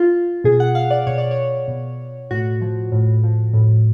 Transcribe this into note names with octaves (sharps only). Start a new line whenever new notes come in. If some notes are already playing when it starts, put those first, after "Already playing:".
Already playing: F4
B2 G#4
F#5
F5
D5
B2 C#5
D5
C#5
B2
A2 F#4
F3
A2
F3
A2